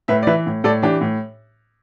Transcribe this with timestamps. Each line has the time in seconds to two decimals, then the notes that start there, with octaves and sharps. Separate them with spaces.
0.08 A2 B4 E5
0.23 D5
0.27 E3 B4 E5
0.46 A2
0.64 A2 A4 D5
0.82 E3 D4 G4
1.01 A2